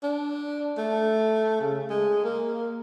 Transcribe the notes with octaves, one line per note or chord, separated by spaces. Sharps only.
D4
A3
C#3
G#3
A#3